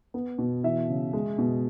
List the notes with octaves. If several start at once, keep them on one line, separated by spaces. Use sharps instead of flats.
B3
B2
E3 E5
C#3
G#3
B2